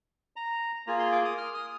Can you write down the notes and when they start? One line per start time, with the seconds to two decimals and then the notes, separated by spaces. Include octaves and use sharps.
0.36 A#5
0.87 A#3 F4 G#4 A#5
0.99 C6
1.12 D6
1.25 D#6
1.38 F6
1.54 D#6